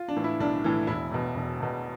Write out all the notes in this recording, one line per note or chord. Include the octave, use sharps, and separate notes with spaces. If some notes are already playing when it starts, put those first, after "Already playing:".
Already playing: F4
D4
A2 E3
E4
B1 D4
A2 E3
E1 E4
E2 B2
E1
E2 B2